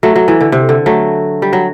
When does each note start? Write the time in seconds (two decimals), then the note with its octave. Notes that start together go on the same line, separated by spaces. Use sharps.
0.03 F#3 A3
0.16 F#3
0.28 E3
0.41 D3
0.52 C3
0.69 D3
0.86 F#3 A3
1.42 G3
1.53 F#3